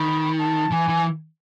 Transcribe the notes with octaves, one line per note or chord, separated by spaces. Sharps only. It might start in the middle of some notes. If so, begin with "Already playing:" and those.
Already playing: D#3 B5
A5
E3 G#5
E3